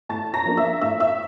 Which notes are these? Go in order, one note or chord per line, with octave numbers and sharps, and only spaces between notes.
A2 A5 A6
A#5 A#6
F3 A#3 D4
E5 E6
A2 E5 E6
E5 E6